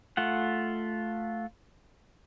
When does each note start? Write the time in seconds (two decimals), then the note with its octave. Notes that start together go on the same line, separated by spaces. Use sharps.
0.17 A3 F4 F#5